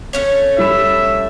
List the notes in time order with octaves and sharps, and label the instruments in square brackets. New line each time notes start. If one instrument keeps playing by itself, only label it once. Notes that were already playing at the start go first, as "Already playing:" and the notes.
[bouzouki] A3 C#4 C#5
[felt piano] G3 B5 E7 [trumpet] E5